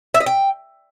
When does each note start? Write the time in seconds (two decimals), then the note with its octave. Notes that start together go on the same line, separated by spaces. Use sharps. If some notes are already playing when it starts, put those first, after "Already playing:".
0.14 E5
0.20 D#5
0.26 G5